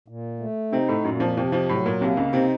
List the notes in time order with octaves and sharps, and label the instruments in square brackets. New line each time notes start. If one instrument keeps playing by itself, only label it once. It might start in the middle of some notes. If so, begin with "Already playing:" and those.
[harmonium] A#2
A3
[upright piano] C3 C4 [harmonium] D#4
[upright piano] A2 A3
[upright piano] F#2 F#3 [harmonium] A#2
[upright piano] F2 F3
[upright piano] F2 F3 [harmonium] C3
[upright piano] F2 F3
[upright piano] A2 [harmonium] F#3
[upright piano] A#2
[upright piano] C2 C3 [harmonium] A#3
[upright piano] C#2 C#3
[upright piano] C3 C4 [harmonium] D#4